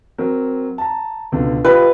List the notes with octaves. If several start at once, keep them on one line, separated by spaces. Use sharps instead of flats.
F#3 C4 A#4
A5 A#5
C#2 B2 D3
F4 G4 B4 D#5